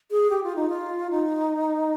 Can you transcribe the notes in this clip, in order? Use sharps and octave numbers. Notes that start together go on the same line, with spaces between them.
G#4
G4
F4
D#4
F4
D#4